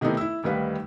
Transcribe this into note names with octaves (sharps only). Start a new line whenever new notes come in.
C3 D#3 A3 B3 D#4 E4
E4 E6
D2 D#3 G3 B4 F5